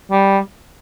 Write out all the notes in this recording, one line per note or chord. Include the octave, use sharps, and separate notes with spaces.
G3